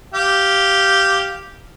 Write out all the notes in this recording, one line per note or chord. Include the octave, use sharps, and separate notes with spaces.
G4 F5